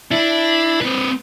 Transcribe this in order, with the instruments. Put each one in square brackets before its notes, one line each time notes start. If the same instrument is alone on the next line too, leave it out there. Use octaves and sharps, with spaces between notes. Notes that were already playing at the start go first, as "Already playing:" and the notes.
[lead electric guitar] D4 [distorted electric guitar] E4
[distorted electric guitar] C4 B4